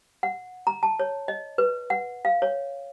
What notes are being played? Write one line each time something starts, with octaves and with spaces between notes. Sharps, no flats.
F#5
A#5
A5
C#5
D#5
B4
F#5
F5
C#5